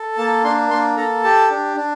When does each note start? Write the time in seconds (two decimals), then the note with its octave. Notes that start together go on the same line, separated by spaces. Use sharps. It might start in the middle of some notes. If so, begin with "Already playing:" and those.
Already playing: A4
0.17 A#3 A5
0.44 D4 C6
0.70 A#3 C6
0.97 A4 A#5
1.24 G4 A5
1.50 D4
1.76 D4